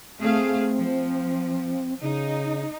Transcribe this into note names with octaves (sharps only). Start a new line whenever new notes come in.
A3 C4 G#4 F5
F3
C#3 D#4